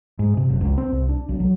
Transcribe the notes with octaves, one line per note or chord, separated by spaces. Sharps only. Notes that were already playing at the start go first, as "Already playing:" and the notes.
G#2
C3
F#1
C#2
C4
C2
D4
B1
F#3